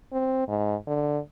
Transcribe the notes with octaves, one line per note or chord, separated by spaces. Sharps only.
C4
G#2
D3